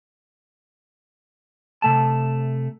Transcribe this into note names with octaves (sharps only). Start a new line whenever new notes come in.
C3 A3 A5